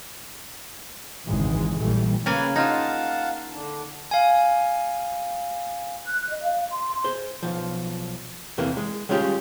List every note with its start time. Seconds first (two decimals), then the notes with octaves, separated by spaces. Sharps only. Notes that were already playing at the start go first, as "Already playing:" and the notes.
1.27 G#1 C#2 F#2 E3 G#3
1.79 A#1 E3 G3 A3
2.26 C#3 A#3 B4 G#5
2.56 D#4 F4 F5 F#5 A5
3.52 D3 D4
4.11 F5 G#5
6.06 F#6
6.28 D#5
6.44 F5
6.71 C6
7.04 G#4 C5
7.43 B1 F3
8.58 E2 C3 E3 A3 A#3
8.77 G#3
9.09 G3 G#3 C#4 F4 G4 G#4